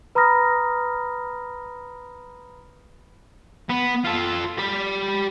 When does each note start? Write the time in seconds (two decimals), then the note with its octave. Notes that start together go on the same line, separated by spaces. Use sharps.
0.15 B4 A#5 B5 D#6 F6 A#6
3.69 B3
4.04 F4 A4
4.59 G4 B5